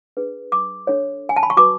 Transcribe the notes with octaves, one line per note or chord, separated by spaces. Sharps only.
D4 G#4 B4
D6
D4 A4 C#5
G#5
A5
B5
C#6
F#4 B4 D6